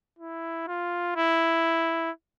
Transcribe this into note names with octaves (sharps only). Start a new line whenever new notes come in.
E4
F4
E4